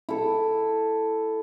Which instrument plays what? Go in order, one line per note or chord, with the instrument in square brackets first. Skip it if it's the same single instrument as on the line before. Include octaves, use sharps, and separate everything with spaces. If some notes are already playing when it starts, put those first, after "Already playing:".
[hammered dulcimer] E4 A4